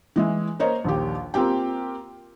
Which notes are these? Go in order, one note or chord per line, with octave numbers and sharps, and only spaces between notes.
E3 G#3 E4
A#3 C5 C#5 D#5
A#1 D#2 G4
A#3 C4 F4 G4 G5